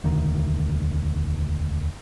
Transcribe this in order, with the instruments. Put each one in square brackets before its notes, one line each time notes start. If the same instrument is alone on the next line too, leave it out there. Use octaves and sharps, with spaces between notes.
[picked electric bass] E1 D2 D#3